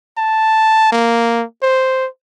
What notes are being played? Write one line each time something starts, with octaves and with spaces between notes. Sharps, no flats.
A5
A#3
C5